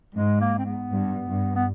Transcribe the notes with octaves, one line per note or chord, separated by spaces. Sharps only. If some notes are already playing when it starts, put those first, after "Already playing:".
G#2 G#3
A#3
C4
B3
G2
G2
B3